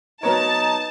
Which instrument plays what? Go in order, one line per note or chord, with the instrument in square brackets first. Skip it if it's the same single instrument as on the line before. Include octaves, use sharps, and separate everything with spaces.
[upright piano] F#3 B3 C#5 [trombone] D#4 [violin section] A5 [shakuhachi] A#5